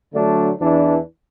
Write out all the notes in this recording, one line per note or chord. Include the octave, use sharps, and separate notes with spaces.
D3 F#3 A3 D4
E2 E3 D4